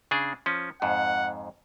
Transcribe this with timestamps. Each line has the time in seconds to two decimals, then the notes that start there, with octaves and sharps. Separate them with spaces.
0.11 C#3 D4 G#4
0.46 F3 C#4
0.82 F2 G#2 F#5